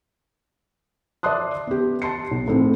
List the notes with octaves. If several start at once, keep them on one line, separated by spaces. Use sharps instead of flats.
D5 E5 A5 C6 D#6 F#6
B3 G4
A5 C6 C7 C#7
B1
A2 C4 G#4